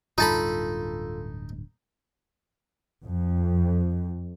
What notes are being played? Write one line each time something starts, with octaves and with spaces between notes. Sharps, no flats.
D1 G2 D#4 F4 A4 A5 B5
F2